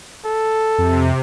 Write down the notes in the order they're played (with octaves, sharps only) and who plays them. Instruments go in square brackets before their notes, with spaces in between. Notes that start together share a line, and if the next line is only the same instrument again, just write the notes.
[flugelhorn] A4
[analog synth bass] F2 [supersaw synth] C3